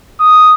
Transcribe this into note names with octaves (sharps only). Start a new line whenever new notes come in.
D#6